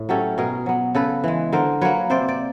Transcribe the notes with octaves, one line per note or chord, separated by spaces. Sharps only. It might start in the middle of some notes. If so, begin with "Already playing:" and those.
Already playing: A2
F#3 A3 C#4 G4 A4
B2 G#4 A#4
F#3 B3
C#3 A4 B4
E3 G#3
D3 A#4 C5
F#3 A#3 B4 C#5
C3 C5 D5
D5